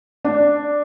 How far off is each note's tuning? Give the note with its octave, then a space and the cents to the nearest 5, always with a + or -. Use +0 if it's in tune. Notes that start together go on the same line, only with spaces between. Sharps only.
D4 +0